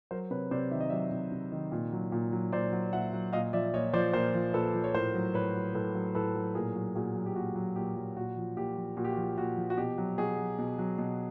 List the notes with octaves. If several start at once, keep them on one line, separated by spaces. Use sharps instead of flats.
F#3 A#4 C5
C3 B4 C#5
C3 C5 D5
D#3 E5
D#5
F#3 D5 E5
C3
C3
D#3
A#2
F#3
A#2
F#3
A#2 C5 D5
F#3
A#2 E5 F#5
F#3
A#2 D#5 F5
F3 D5 E5
A#2 C#5 D#5
F3 C5 D5
A#2 A#4 C5
F3
A#2 A4 B4
F3
C#5
A2 A#4 C5
F#3
A2 B4 C#5
F#3
A2 A4 B4
F#3
A2 A4 B4
F#3
A#2 G#4 A#4
F#3
A#2 F#4 G#4
F#3
G4
A#2 F#4
F#3
A#2 G4
F#3
A#2 F#4
F3
A#2 G4
F3
A#2 F#4
G4
F#4
F3
A#2 F#4
F3
F#4
B2 G4
F#3
B2 F#4 G#4
F#3
B2
F#3
B2